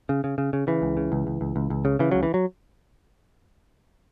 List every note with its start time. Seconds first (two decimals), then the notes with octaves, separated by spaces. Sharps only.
0.09 C#3
0.24 C#3
0.38 C#3
0.53 C#3
0.67 C#3 E3
0.82 C#2
0.97 C#3
1.12 C#2
1.27 C#2
1.41 C#2
1.56 C#2
1.70 C#2
1.85 C#3
1.99 C#3 E3
2.11 C#2 F#3
2.23 E3
2.34 F#3